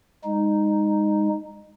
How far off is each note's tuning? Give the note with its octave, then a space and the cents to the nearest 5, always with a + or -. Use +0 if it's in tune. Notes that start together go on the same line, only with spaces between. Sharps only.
G#3 -25 D#4 +0